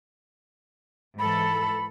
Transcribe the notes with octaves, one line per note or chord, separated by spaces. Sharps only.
G#2 E3 A4 B5